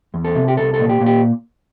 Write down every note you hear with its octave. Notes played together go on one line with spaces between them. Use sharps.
E2
A4
C3
G4
C2 A4
A4
A#2
G4
A#2
G4